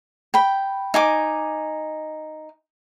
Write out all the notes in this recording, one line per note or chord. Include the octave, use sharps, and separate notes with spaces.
G5 B5
D#4 G#5 D6